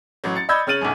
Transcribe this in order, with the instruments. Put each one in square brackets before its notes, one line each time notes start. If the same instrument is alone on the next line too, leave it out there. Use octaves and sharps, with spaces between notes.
[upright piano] A1 F#3
A6 C#7
D5 D#5 B5 E6 G6 G#6
C#3 C#4 F6 A6 D#7 F#7
B1 F#2